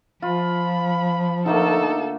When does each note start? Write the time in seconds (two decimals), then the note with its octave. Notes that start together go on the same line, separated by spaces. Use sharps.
0.22 F3 F4 B5
1.46 D3 A3 A#3 D#4 A4